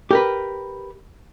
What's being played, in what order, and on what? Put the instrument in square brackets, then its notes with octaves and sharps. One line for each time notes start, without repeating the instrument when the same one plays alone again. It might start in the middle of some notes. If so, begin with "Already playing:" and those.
[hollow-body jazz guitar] G4 A#4 B4